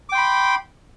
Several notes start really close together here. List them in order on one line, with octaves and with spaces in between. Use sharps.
D6 G5 C6 B5